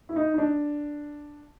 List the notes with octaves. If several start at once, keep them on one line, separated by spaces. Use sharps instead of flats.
E4
D#4
D#4
D4